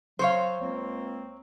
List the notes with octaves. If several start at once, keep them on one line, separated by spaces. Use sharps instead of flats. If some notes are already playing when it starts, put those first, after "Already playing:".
F#3 C5 C#5 F5
C#2 A#3 C4